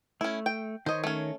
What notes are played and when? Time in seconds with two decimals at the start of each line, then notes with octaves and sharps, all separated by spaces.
0.21 A3 C#4 E4
0.46 G5
0.86 D#3 C5 C#5 D#5
1.04 A3 C#4